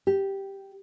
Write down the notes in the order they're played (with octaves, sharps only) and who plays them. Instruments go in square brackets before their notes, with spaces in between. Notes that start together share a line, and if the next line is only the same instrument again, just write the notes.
[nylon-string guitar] G4